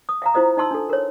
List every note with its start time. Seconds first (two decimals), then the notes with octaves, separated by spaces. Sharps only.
0.09 D#6
0.22 E5 F5 A#5
0.34 E4 F4 C5 D#5 D#6
0.57 D#4 D#5 A5 C6 E6
0.71 D4 A4
0.90 A#4 C#5